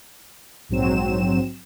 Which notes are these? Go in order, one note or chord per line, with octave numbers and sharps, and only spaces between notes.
A#1 G#2 F#3 C4 E7